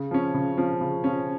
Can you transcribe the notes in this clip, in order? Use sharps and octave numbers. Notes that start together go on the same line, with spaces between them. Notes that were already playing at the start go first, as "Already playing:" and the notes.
Already playing: C#3
F3 C#4
C#3
F3 C#4
C#3
F3 C#4